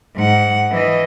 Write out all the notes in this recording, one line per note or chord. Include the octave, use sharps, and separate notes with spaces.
G#2 F#5
E3 D#5